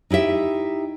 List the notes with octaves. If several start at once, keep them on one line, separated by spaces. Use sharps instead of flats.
D#4 E4 G4 E5